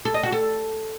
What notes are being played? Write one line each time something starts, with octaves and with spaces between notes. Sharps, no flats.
A4
D#5
F#4
A4